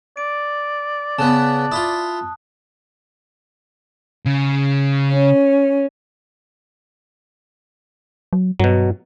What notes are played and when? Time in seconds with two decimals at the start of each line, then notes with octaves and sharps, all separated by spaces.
0.17 D5 D7
1.19 C#3 B3 A5 F#6
1.72 E4 F4 D#6
4.26 C#3
5.10 C#4
8.33 F#3
8.60 G2 B2 F#3